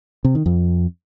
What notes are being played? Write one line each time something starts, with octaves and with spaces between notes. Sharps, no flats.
C3
D#3
F2